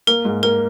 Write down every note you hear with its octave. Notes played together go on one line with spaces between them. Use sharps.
A#3 A#4
G#2
A#3 A#4